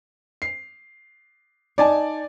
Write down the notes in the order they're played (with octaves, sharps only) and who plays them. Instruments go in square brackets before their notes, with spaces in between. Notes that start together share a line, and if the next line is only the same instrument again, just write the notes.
[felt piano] C7
[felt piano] D#4 G#5 A5 [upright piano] D5